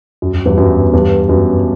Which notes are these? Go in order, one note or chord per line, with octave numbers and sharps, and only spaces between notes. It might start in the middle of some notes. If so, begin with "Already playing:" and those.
F#2
F#2
E2 G2
F#2
E2 G2
F#2